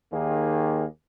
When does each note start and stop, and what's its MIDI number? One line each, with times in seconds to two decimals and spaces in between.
0.12 0.85 39
0.12 0.85 51
0.12 0.85 58
0.12 0.85 68